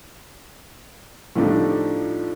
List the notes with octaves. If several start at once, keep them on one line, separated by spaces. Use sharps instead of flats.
A2 F3 G3 A3 D4 D#4